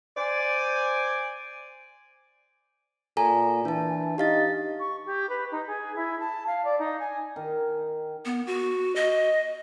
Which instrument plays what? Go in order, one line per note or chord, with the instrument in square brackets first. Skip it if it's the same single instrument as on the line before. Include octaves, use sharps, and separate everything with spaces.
[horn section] C5 D5 G#5
[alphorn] A#2 [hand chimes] A4 G#5 A#5
[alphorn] E3 [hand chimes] D4 A5
[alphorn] D#4 [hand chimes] G4 F5 A6
[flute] C#6
G4
B4
D#4
G#4
E4
A5
F5
D5
D#4
G#5
[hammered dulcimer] D#3
[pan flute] B3
F#4
D#5